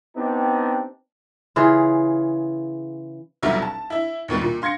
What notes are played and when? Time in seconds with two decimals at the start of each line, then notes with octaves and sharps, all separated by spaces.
0.15 B3 C4 D4 D#4 G4
1.56 C#3 E3 F4 G#4
3.42 F1 B1 F#3 G3 E5
3.62 A5
3.90 E4 E5
4.28 A#1 D#2 B2 G3
4.41 A#2
4.62 F5 C6 G#6 A#6 C#7